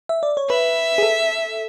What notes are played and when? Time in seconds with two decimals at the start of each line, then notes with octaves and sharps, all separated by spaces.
0.09 E5
0.23 D5
0.37 C#5
0.50 B4 E5
0.98 G#4
1.03 A4